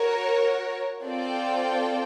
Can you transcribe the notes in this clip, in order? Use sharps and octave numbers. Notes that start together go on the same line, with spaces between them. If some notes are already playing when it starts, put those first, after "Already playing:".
Already playing: F#4 A#4 C#5
C4 F4 A4 D5 G5